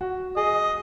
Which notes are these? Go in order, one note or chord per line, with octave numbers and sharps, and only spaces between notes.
F#4
G#4 D#5